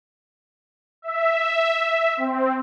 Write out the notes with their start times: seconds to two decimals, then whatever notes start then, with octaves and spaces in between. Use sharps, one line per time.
1.02 E5
2.17 C4